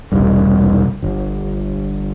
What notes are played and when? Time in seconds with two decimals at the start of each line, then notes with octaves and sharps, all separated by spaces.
0.12 E1 C2 G2
1.03 G1